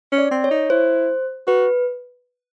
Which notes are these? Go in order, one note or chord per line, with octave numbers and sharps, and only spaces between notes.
C#4
D5
C4
C#5
D#4
E4 C5
F#4 B4